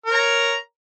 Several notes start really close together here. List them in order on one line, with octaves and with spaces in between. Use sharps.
A#4 C#5 A#5